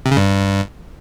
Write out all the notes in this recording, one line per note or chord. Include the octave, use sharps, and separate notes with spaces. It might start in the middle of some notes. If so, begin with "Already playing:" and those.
C3
C#3
G2